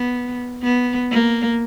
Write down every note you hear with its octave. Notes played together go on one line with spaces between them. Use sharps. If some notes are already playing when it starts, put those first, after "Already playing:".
Already playing: B3
B3
A#3